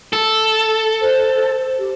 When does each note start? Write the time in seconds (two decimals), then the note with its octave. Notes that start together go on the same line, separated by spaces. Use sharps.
0.13 A4
1.01 C5
1.79 G4